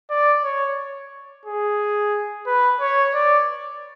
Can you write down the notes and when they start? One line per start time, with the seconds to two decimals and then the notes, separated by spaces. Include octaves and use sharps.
0.10 D5
0.44 C#5
1.46 G#4
2.47 B4
2.81 C#5
3.14 D5